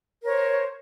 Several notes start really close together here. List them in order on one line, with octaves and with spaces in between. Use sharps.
A#4 C#5 C5